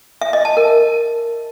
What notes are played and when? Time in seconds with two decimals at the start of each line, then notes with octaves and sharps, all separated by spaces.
0.21 E5
0.33 D#5
0.45 A5
0.57 A#4